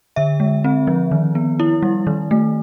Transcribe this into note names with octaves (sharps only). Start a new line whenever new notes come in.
D3 E5
G#3
C4
F3
D#3
B3
E4
G3
D#3
A3